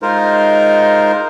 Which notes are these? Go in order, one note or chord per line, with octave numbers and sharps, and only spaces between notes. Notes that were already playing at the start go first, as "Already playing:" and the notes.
G#3 D#4 F4 A#4 C5